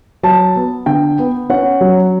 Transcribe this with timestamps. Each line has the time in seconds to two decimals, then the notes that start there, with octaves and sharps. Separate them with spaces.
0.23 F#3 A5
0.56 B3
0.86 D3 G5
1.19 B3
1.50 C#4 F#5
1.81 F#3